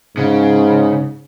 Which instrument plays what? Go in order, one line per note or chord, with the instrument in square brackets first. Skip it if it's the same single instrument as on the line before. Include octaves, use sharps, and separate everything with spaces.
[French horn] G#2 [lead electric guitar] C#3